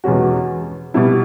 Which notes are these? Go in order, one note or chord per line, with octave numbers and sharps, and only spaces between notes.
E2 B2 G#3 C#4 F#4
B2 G3 B3 E4